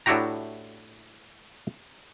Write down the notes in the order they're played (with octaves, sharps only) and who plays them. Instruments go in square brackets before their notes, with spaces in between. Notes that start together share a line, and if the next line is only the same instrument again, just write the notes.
[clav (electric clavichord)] A2 D4 E4 F#4 G4 A#5